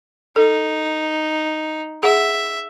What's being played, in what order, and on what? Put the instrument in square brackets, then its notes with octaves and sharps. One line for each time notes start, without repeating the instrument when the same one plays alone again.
[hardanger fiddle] D#4 [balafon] A4
[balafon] G#4 F#5 [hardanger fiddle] E5